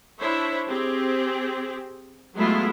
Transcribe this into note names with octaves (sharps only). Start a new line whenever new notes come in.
D4 E4 C5 C#5 E5
C4 G4 G#4
F#3 G#3 A3 B3 E4 F4